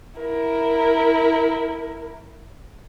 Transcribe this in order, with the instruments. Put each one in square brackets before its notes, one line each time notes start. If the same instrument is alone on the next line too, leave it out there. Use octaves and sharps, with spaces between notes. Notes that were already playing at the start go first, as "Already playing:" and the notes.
[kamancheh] E4 A#4